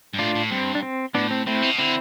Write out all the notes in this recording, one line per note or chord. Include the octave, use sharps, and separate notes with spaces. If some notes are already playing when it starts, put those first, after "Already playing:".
G2
A2 D4 F4
A2
G2 C4
D4
C4
A2 B3 D4
C4
A2 C4 E4
B2
D3 C4 E4